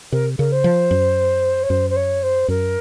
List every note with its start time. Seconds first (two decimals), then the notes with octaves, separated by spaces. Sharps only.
0.12 C3 A#4
0.38 C#3 A#4
0.52 C5
0.64 F3
0.91 F#2
1.63 C#5
1.70 F#2 C5
1.90 C5
1.96 C#5
2.23 C5
2.48 F#2 A#4